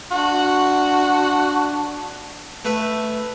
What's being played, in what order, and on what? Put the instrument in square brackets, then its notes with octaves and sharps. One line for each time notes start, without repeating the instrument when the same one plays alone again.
[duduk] D4 [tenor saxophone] F#4
[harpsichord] A3 B4 E5